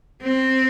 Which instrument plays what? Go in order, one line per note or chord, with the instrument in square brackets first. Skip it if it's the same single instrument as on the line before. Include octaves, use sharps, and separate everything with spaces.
[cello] C4